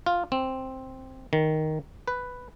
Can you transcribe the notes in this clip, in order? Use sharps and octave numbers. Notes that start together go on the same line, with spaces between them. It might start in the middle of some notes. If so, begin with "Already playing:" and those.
F4
C4
D#3
B4